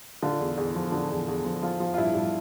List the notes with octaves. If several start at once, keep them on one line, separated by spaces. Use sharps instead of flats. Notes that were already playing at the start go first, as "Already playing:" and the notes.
D3 F4
E2
E2
F3
D3
E2
E2
F3
F3 F4
F3
F4
G2 E4
G2